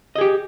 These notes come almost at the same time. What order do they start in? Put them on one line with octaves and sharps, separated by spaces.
D#5 G#4 G4